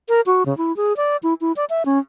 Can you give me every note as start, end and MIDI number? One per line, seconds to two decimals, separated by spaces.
0.09 0.21 70
0.26 0.43 66
0.46 0.56 49
0.58 0.75 64
0.77 0.96 68
0.97 1.17 74
1.23 1.34 64
1.41 1.52 64
1.56 1.65 74
1.70 1.83 76
1.86 1.99 61